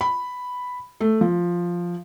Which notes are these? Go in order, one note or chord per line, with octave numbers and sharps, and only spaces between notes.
B5
A3
F3